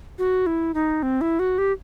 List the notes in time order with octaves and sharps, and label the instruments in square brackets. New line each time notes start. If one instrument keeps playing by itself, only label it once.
[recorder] F#4
E4
D#4
C4
E4
F#4
G4